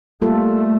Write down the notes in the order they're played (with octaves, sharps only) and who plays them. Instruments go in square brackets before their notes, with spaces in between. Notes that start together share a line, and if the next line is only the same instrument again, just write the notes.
[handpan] G3 A#3 F4 A4 [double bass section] A3